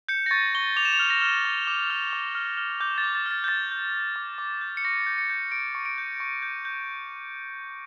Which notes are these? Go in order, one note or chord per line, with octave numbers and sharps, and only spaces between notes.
G6 C#7
A#6
C#6 A6
C#6 G7
D6 F7
E7
F7
F6
A#6
F6
D6
D6
F6
D6
F6
F6
D6 G6
A6
D6
A6
F6 A6
G6
D6 A6
G6
G6
D6
D6
G6
C#7
C#6 A#6
G6
C#7
G6
C#6 D7
C#6
D7
G6
C#6
G6
G6